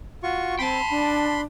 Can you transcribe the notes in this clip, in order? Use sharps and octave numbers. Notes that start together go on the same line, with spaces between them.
F4 F#4 C#6
C4 G5 A5 B5 C6
D4